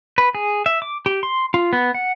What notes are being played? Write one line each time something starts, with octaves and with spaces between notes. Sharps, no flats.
B4
G#4
E5
D6
G4
C6
F4
B3
F#5